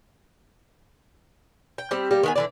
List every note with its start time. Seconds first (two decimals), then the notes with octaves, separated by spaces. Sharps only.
1.78 G5
1.91 G3 C4 G4
2.11 G3 A#3 G4
2.23 D#3 B3 G#5
2.36 D3 E3 D5